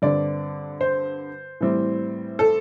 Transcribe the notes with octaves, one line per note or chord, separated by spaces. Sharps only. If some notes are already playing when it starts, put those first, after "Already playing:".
G2 D3 G3 C4 D5
C5
A2 E3 G3 C4
A4